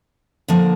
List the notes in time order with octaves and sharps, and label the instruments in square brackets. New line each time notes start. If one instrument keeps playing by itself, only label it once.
[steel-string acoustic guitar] D3 F3 A#3